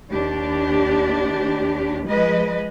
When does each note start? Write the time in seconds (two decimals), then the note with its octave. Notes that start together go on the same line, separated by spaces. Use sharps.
0.11 D#2 D4 G4
2.07 F3 G#3 B4 D#5